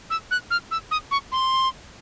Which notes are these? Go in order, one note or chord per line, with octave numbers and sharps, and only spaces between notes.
E6
F#6
F6
E6
D#6
C#6
C6